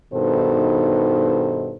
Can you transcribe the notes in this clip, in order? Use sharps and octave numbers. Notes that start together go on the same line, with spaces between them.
G2 B2 D#3 D#4 A4 C5